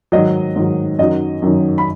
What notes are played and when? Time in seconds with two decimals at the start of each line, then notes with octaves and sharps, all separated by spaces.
0.12 G#2 D#3 F#3 D#5
0.56 G#2 D#3 F#3
0.99 F#2 D#3 F#3 D#5
1.42 F#2 D#3 F#3
1.78 B5